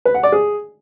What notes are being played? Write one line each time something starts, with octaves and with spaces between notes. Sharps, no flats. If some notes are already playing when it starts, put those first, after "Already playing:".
B4
F#5
D5
G#4